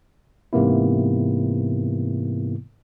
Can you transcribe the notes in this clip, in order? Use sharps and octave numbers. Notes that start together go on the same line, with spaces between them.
G#2 C3 E3 A#3 B3 E4